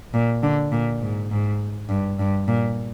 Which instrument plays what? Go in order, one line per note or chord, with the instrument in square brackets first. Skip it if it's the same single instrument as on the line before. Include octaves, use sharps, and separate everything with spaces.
[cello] A#2
D3
A#2
G#2
G#2
G2
G2
A#2